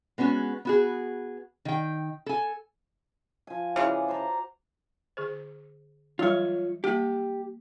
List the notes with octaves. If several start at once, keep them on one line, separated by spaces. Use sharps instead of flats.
G#3 B3 C#4 F#4
B3 F#4 G#4
D#3 G5
A4 G#5
F3 G#5
C#3 E3 G#3 F#4 D5 F#5
C5 A5 A#5
D3 G#4 C5
E3 F#3 G3 F4 C#5
G3 A#3 G4 A5